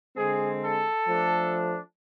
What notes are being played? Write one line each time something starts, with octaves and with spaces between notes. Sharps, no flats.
D3 G#3 C4 G#4
A4
F3 A3 D4